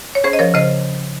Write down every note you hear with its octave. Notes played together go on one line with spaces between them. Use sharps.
C#5
C#4 G#4 C5
D#5
F3 A#4 C#5
C#3 C5 D#5